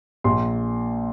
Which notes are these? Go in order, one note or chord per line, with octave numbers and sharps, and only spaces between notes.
A#1 C6